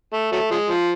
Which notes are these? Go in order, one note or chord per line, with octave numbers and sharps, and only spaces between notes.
A3
F#3 A3
F3 G#3
F3